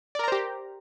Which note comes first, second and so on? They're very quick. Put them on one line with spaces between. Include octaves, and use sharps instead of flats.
D5 A#4 A#5 C5 G4